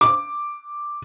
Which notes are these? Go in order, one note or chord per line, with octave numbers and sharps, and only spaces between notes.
D6